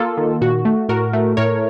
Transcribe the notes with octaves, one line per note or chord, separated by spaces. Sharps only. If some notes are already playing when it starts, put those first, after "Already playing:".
Already playing: A#3 F4 A4
D#3
A#2 F#4
A3
A2 F#4 A#4
A3
A2 A#4 C#5